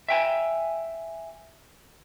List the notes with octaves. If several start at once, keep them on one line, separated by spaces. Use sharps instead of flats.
E5 G5 G#5